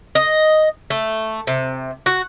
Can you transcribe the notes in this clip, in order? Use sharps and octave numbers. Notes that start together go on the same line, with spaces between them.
D#5
A3
C3
F#4